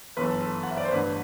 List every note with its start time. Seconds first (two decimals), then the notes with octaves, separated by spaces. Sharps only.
0.17 G1 F#2 E3 B4
0.24 A4
0.41 A4
0.63 F#5
0.71 E5
0.77 D5
0.85 C5
0.92 A1 G2 D3 B4